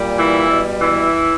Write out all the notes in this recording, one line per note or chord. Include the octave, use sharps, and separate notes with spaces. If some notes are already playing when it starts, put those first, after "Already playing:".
Already playing: A#2 G3
E3 E4
B2 G3
E3 E4